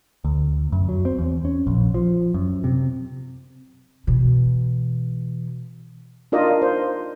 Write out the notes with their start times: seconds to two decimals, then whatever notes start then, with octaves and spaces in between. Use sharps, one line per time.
0.25 D2
0.72 F#2
0.89 F#3
1.05 C4
1.19 E2
1.45 C#4
1.67 A#1
1.94 F3
2.34 F#2
2.64 C3
4.07 B2 E3
6.32 D4 D#4 F4 A#4 D5 D#5
6.62 C5